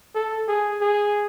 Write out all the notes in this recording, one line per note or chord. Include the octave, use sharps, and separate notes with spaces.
A4
G#4
G#4